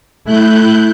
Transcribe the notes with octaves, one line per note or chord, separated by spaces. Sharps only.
A3 E4 F#6 G6